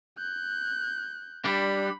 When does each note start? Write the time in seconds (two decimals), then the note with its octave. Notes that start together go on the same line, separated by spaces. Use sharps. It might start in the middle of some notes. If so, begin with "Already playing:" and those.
0.18 F#6 G6
1.45 G3 D4 B5